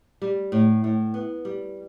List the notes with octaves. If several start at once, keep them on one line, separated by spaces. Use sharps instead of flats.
G3
A2
A2
B3
G3